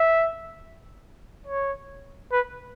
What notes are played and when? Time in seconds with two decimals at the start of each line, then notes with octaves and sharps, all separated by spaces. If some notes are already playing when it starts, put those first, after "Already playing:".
Already playing: E5
1.47 C#5
2.32 B4